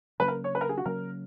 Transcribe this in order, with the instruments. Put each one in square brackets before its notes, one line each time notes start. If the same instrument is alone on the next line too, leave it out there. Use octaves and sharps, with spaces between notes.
[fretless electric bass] C#3 F#3 A#3 C#4 [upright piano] B4
[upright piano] A#4
C#5
B4
A#4
G#4
F#4
[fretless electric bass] C#3 F#3 A#3 C#4 [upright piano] A#4